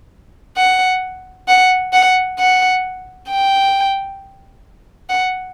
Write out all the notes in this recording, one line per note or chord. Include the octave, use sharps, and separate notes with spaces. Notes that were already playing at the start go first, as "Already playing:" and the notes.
F#5
F#5
F#5
F#5
G5
F#5